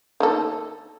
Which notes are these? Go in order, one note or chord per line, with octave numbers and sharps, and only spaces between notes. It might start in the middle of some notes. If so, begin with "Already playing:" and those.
D#3 A#3 A4